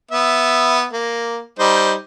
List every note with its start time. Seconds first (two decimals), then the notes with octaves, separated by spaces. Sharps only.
0.11 B3 E5
0.93 A#3
1.59 G3 D#4 C5